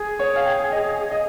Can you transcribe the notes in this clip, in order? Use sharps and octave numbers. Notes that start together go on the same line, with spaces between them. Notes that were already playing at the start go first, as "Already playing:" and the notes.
Already playing: G#4
C#5
F5
G5
D#5
D#5